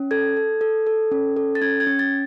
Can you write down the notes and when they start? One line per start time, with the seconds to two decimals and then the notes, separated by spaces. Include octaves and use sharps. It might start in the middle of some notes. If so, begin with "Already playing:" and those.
Already playing: C#4
0.11 A4 G#6
0.37 A4
0.61 A4
0.87 A4
1.12 C#4
1.37 A4
1.55 A6
1.61 C#4 G#6
1.80 G#6
1.87 C#4
1.99 A6